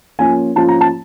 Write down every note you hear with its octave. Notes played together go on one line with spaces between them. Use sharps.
F3 A#3 C#4 F4 G#5
F3 A#3 C#4 F4 A5
A#5
A5